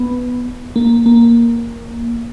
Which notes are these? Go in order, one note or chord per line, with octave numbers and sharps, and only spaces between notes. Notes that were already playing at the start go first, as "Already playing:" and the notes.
Already playing: B3
A#3
A#3